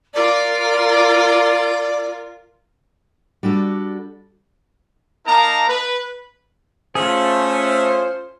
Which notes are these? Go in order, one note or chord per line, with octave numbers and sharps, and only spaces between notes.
F4 A#4 D5
G3 D4 F#4 A4
A#3 D#4 A#4 A5 A#5
B4
A3 C#4 F4 G#4 C5